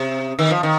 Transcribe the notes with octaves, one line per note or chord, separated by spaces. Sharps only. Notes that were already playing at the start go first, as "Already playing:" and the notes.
Already playing: C3
D#3
F3
D#3